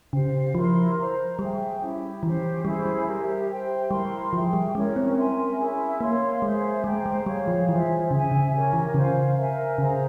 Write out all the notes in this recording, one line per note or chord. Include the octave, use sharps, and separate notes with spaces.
C#3 G4 C5 F5
F3 E4 A#4 F5 C6
C5 F5 A#5
G3 G#4 E5 G5
C#4 E4 G4
E3 C#4 G4 C5
G3 E4 G#4 C5
G3
G4 A#4 E5
C5 E5 G5
G3 E4 A#4 F5 C6
F3 G#4 E5 G5
G3
G#3 C#4 E4 A#4 C#5
C4
A#4 E5 G#5 C6
C#4 E4 G#4 E5
A#3 A#4 C#5 F5 C6
G#3 G#4 C5 E5
G#3 C5 G5 A#5
G#3
G3 G#4 C#5 F5
F3
E3 F4 G#4 C5 E5
C#3 G#4 E5 G#5
C#3
C#4 G4 A#4 C#5
E3
C#3 F4 C5 F5
A#4 E5 G#5
C#3 G#4 C5 F5 A#5